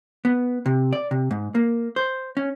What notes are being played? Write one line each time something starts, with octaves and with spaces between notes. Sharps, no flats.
B3
C3
D5
C3
G#2
A#3
C5
C#4